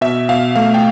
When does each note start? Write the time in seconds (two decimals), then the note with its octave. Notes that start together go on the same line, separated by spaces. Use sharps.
0.01 B2 E5
0.29 B2 F5
0.56 A3 F5
0.74 G5